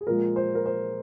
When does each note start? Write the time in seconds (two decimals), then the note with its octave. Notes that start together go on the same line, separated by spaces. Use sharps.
0.01 G#4
0.07 A#2 F3 G#3 A#4
0.36 C5
0.55 A#4
0.66 C5